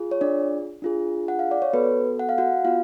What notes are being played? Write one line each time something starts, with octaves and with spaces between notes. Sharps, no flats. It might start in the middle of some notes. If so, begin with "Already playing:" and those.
Already playing: F4 G#4
C#5
D4 D5
D4 F4 G#4
F#5
F5
D5
C#5
B3 F#4 A4 B4
F#5
F5
F#4 F#5
B3 F4 F#4 F5